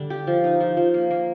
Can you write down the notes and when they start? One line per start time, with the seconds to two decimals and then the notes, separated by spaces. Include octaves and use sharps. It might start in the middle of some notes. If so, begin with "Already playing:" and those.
Already playing: D3 G3 D4
0.10 G4
0.27 F3
0.44 D#4
0.60 F3
0.77 F3
0.94 A#3
1.11 A#3